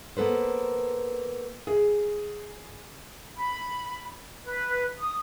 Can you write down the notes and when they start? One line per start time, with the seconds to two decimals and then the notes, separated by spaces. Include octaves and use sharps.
0.17 A#3 B3 A4 B4 C5
1.67 G#4
3.38 B5
4.44 B4
4.99 D#6